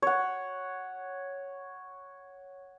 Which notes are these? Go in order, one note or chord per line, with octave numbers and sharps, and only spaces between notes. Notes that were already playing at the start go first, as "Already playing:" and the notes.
C#5 F#5